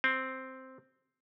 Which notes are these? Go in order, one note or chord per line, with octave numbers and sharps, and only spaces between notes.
C4